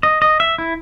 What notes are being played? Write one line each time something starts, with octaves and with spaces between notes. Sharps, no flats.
D#5
D#5
E5
E4